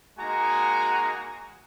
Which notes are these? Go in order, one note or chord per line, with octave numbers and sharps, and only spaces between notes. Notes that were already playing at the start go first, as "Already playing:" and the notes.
G#3 A#3 D#4 F#4 G#5 A#5